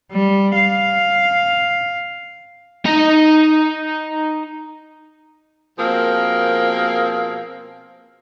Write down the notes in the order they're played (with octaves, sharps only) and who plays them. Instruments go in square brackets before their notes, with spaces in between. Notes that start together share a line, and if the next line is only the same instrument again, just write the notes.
[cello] G3
F5
[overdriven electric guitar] D#4 A#5
[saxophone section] B2 F3 A#3 C4 G#4 A#4